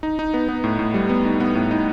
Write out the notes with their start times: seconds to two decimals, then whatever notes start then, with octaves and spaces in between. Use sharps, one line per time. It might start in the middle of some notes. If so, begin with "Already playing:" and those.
0.03 D#4
0.19 D#4
0.34 B3
0.49 B3
0.64 A2
0.79 A2
0.94 G3
1.09 B3
1.25 D#4
1.40 B3
1.55 A2
1.71 D#4